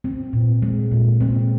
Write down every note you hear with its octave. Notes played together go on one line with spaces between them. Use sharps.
C4
A#2
G#3
A#2
C4